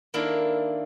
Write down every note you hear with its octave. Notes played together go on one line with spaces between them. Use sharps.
D#3 A#3 D4 E4 F4 A4